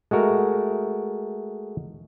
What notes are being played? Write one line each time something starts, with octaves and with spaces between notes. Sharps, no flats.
G#3 A3 F#4 A#4